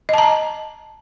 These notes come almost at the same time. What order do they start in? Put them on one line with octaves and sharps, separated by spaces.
D#5 A5 A#5